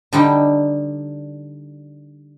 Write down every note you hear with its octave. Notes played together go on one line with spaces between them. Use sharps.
D3 G3 D#4 G5